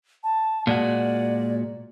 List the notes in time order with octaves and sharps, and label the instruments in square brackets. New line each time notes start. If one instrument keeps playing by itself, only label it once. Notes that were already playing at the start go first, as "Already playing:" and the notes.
[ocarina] A5
[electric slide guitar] A#2 G#3 F#4 [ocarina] D5